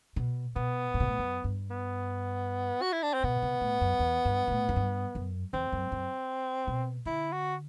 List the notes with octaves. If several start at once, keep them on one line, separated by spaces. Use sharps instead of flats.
B2
B2 B3
A2
B2
A2
F#2
G2
B3
F#4
E4
D4
C4
B2 B3
C3
A2
F#2
E2
G2
B2
A2
F#2
G2
F#2
E2 C4
F#2
F#2
B2
D3 E4
F#4